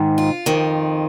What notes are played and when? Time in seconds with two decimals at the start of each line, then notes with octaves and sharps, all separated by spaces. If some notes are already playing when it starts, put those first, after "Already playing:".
Already playing: G#2 D#3
0.18 F4
0.46 F2 D#3